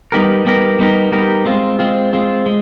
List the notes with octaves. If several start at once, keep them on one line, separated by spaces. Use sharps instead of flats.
G3 B3 D#4 G4 A#4
G3 B3 D#4 G4 A#4
G3 B3 D#4 G4 A#4
G3 B3 D#4 G4 A#4
G#3 C4 F4
G#3 C4 F4
G#3 C4 F4
G#3